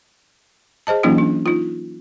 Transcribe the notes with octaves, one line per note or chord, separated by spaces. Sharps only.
G#4 C5 D#5 A5
E3 F#3 A#3 C#4 D#4 F4
D4
D#4 F4